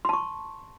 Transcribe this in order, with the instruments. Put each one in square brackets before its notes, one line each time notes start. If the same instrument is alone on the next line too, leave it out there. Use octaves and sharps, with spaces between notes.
[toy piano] C6
A5
C#6